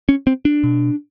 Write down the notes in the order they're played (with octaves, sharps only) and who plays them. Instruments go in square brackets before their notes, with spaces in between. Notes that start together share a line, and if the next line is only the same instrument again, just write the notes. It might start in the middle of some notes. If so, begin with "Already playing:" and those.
[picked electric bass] C#4
C4
D4
B2